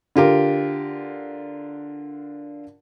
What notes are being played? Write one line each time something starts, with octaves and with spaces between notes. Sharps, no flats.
D3 F4 G4 A#4